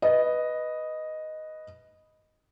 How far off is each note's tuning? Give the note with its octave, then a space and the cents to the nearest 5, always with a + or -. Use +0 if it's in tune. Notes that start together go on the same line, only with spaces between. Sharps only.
B4 +0 D#5 +0